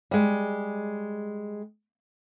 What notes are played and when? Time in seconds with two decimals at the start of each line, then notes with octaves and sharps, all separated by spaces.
0.11 G3 G#3